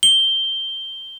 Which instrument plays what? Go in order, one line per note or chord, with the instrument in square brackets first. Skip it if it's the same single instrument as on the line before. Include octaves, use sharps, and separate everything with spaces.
[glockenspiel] G7